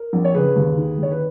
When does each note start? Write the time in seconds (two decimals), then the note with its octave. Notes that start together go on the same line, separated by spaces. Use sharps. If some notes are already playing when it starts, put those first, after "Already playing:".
Already playing: A#4
0.13 A#1
0.25 C#5
0.34 C#3 G#4 B4
0.56 D#2
0.77 D#3
0.98 D#2 C#5
1.11 B4